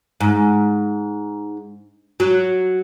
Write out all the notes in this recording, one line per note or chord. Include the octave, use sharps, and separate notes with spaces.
G#2
F#3